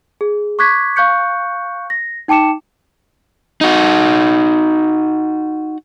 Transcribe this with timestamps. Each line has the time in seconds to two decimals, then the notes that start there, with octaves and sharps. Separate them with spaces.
0.21 G#4
0.59 C#6 D6 F#6 G#6 B6
0.96 F5 C#6 F#6 G6 C#7
1.90 A#6
2.28 D#4 G5 A5 D6 C#7 E7
3.61 D#4 F#4